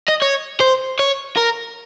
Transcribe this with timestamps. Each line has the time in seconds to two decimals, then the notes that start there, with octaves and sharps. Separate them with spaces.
0.09 D#5
0.22 C#5
0.61 C5
0.99 C#5
1.37 A#4